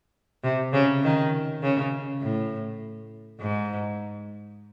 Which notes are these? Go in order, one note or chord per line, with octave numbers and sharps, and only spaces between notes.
C3
C#3
D#3
C#3
A2
G#2